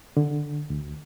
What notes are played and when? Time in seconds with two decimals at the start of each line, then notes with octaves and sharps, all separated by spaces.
0.17 D3
0.70 D2